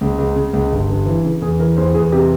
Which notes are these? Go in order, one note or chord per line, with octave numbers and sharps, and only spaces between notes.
C#2
C#2
C#3
C#2
G1
G1
E3
C#3
E2 G#4
E3 A#4
E2 C5
E2 G#4
C3 G4